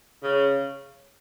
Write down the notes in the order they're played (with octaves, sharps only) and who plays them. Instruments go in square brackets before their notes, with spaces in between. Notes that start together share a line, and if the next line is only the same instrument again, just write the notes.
[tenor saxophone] C#3